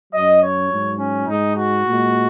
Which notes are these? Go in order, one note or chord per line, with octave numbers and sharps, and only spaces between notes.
F#2 F#3 D#5
C#5
G#2 F#3
C#4
G#2 G#3 D#4
F#4
A#2 G#3